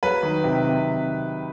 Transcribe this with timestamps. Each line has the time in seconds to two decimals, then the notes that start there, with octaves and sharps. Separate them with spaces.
0.03 F#3 B4
0.23 D#3
0.44 C3
0.64 C3